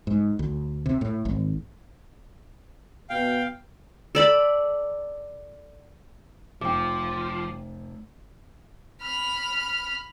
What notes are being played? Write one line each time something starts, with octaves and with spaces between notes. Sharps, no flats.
G#2
D2
C3
A2
G#1
B2 F5 G5
A4 D5 B5
F1 F3 G5 D6
B5 F6